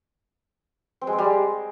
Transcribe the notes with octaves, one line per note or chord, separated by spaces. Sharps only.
C4
G#3
C4
G3
G#3